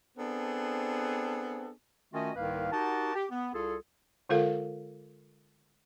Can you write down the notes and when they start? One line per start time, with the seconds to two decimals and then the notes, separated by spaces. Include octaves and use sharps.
0.18 B3 C4 D4 G#4 A4
2.13 D#3 A3 C#4 F4 F#4 D#5
2.36 C2 G#2 D#3 A#3 B4 F5
2.72 D#4 F#4 G4 A#4 F#5 A5
3.15 G4
3.31 B3
3.54 C2 F4 G#4 A4
4.29 D3 G#3 F4 A4 A#4 F5